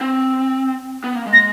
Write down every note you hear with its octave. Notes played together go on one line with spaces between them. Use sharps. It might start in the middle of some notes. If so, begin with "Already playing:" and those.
C4
B3
A#3
G#3
A#6